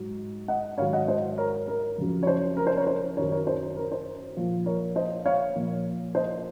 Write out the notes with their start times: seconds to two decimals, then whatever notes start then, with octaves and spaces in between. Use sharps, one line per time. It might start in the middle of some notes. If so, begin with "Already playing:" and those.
Already playing: G#2 F#3
0.48 D#5 F#5
0.78 G#2 D#3 F#3 C#5 F5
0.93 D#5 F#5
1.08 C5 D#5
1.38 A#4 C#5
1.68 A#4
1.98 F2 C#3 F#3
2.23 C#5
2.27 C5
2.57 A#4
2.67 C5
2.77 A#4 C#5
2.87 C5
3.17 F#2 D#3 F#3 A#4 C#5
3.32 A#4 C#5
3.47 C5
3.77 A#4
3.92 C5
4.36 A#2 F3
4.66 A#4 C#5
4.96 C5 D#5
5.25 C#5 F5
5.56 A#2 F3
6.15 C5 D#5